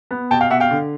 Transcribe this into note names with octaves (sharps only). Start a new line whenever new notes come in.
B3
B2 G5 A5
F5 G5
B2 E5 F#5
F5 G5
D3